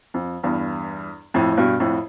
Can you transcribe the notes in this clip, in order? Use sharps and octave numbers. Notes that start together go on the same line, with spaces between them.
F2
E2 G2
F2 A2
A2
G2 B2
F2 A2